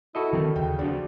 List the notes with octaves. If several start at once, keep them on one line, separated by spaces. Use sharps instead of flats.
E4 F#4 A4 D#5
D3 D#3 F3 C4
D#2 C#3 G5
D2 F3 D4 F#4